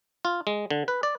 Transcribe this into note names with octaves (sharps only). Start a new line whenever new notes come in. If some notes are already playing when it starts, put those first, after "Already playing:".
F4
G#3
D3
B4
D5